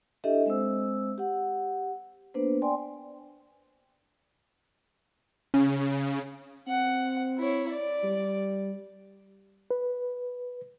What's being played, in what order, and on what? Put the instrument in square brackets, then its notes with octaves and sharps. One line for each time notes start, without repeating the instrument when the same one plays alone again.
[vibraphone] D4 E4 G4 A4 D#5 E5
G#3 C4 C5 E6
G4 F#5
A#3 B3 D4 B4 C5
D5 G5 G#5 C6
[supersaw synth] C#3 [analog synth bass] C#4
[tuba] C4 [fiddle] F#5
[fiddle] E4 C#5
D5
[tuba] G3
[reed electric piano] B4